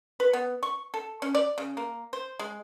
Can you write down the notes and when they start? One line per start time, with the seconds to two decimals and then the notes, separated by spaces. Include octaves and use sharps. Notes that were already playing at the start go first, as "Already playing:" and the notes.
0.20 B4
0.33 B3
0.63 C#6
0.94 A4
1.22 C#4
1.35 D5
1.58 C#3
1.77 A#3
2.13 C5
2.39 G#3